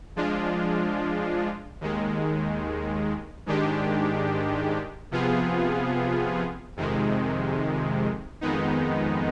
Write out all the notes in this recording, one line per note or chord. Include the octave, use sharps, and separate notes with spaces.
F3 G#3 D4 F4
D#2 D#3 G#3
G#2 D#3 G#3 D4 G4
C3 F3 B3 F4 G#4
F2 C3 D#3 G#3
F2 D#3 G#3 B3 D#4